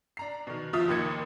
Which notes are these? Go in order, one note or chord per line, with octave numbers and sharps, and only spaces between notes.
D4 A#5 C7
B2 D#3
G1 F3 F4 E5 D#6
A1 D#2 A#3 D#4 G#6 C#7